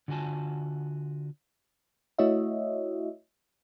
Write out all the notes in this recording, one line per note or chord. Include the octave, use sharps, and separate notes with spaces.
D3 F4 F#4 G#5 A5
A3 E4 F#4 C#5 D#5 E5